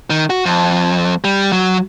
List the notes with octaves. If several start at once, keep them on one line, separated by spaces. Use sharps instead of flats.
D#3
F#4
F2
G3
F#3